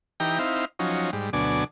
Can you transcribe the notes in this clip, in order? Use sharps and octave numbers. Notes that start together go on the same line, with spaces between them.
E3 D#4 G4 G5 A#5
C4 D#4 E4 F5
F3 F#3 C#4 D#4
G#2 G3
D2 B2 F#3 D4 G#5 D6